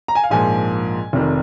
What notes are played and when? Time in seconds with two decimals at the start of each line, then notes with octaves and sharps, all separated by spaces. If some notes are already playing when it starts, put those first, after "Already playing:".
0.08 A#5
0.15 G#5
0.24 F5
0.30 A#1 G#2 F3 A#3 G#5
1.13 F1 F2 C3 D#3